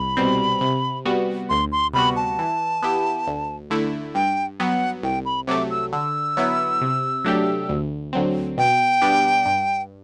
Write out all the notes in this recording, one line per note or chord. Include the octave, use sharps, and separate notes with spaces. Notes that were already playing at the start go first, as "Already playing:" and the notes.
Already playing: C2 B5
B2 G3 C4
C3
G3 B3 F#4
D2 C6
C6
C3 G3 B3 F#4 B5
A5
E3
B3 E4 G4
D2
D3 A3 E4
G2 G5
F#3 B3 F#5 G5
C2 G5
B5
C3 F#3 A3 D6
E6
D3 E6
F#3 B3 E4
C3
F#3 A3 D4 G4
D2
D3 F#3 C4
B2 G5
G3 B3 D4 G4
G2